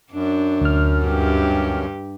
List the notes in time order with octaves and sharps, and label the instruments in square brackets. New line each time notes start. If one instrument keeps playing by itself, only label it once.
[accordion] F#2 [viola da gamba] D4
[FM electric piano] D2 F6
[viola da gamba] G2 G4